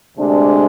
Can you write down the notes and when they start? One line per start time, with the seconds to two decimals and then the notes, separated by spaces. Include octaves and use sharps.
0.17 D2 C3 G#3 D4